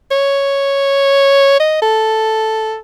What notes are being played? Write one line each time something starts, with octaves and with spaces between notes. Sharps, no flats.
C#5
D#5
A4